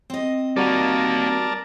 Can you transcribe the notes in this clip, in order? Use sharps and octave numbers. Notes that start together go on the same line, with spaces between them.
C4 D#5
G3 A#3 D#4 F#4 A#4 D5 A5